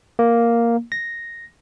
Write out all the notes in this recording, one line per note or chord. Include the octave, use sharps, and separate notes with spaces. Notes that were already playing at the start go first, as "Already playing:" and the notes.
A#3
A#6